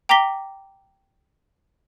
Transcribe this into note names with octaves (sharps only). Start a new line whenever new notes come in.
G5 A#5 D6 A#6 B6 G7